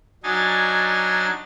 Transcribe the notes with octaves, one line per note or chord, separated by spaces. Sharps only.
F#3 D4 D#4 G#5 A6